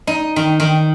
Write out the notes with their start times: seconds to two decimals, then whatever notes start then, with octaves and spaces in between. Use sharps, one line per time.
0.07 D#4
0.36 D#3
0.60 D#3